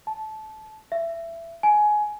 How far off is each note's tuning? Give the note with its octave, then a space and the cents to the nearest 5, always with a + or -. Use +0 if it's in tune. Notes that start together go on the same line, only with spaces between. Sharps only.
A5 -20
E5 +20
G#5 +15